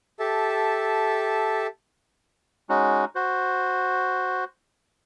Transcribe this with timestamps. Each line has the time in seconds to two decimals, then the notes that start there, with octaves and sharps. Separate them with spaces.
0.19 G4 A4 E5 A5
2.69 G#3 C#4 D#4 F#4
3.15 F#4 C5